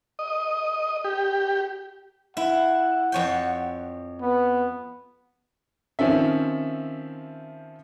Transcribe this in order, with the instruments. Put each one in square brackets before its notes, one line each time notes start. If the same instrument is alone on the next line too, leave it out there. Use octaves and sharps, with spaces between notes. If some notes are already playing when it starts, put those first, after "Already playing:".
[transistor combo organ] D#5
G4
[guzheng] E4 [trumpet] F#5
[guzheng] F2 C#5 G5
[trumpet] B3
[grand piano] D#3 F3 C4 C#4 E5